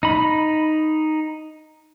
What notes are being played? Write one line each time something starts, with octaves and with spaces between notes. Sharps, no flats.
D#4 B5